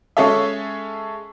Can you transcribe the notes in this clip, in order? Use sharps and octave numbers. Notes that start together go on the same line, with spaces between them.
G#3 C#4 G#4 A4 C#5 E5